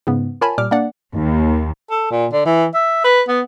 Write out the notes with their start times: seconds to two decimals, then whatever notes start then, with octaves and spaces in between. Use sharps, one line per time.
0.07 G#2 C#3 B3
0.41 F4 A#4 C#5 G#5 A5 B5
0.58 A#2 G3 D6 F6
0.71 A#3 D4 D5 F#5
1.16 D#2
1.90 A4
2.11 A#2
2.32 D3
2.45 E3
2.74 E5
3.04 B4
3.28 B3